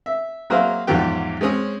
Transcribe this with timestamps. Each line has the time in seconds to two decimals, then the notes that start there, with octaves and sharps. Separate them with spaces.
0.06 E5
0.50 F#3 A#3 G#4 C5 E5 F5
0.87 E2 G#2 F3 F#3 G4 G5
1.41 G#3 C4 C#4 G#4